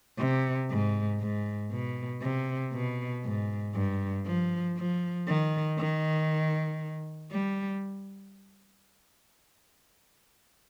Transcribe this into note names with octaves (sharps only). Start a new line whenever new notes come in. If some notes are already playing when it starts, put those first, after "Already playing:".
C3
G#2
G#2
B2
C3
B2
G#2
G2
F3
F3
D#3
D#3
G3